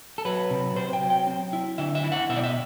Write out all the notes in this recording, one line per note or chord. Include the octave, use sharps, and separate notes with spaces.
A4
F#3 B4
C3
C3 C5
G5
F#3
G5
C4
E4
D3 E5
E5
E4
F#5
B2 E5
D5
E5